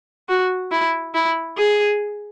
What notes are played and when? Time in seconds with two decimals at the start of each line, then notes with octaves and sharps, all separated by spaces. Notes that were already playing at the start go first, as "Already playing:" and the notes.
0.29 F#4
0.71 E4
1.14 E4
1.58 G#4